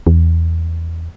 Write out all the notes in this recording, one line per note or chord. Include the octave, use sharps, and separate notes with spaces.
E2